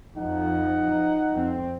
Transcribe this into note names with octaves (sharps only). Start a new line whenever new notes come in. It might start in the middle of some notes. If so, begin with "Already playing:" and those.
F2 F3 D#4 F#5
F2 C4